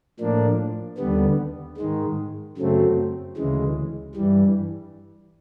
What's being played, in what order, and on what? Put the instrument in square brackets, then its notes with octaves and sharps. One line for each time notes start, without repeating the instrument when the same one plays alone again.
[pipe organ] A2 F3 A#3 D4
D#2 D3 G3 B3
G#2 D#3 G#3
F#2 C#3 F#3 A3 C4
D2 C#3 E3 G#3
G2 E3 G3